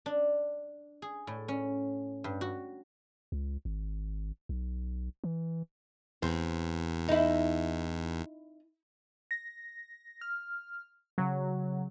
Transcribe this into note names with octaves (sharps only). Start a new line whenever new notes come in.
D4
G#4
A2
C#4
G2
F#4
C#2
G#1
B1
E3
E2 C4
D#4 E4
A#6
F6
C#3 F#3